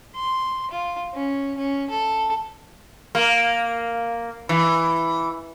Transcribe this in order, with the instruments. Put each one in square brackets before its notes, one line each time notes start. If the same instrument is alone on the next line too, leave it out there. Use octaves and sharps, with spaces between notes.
[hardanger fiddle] C6
F4
C#4
C#4
A4
[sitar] A#3
E3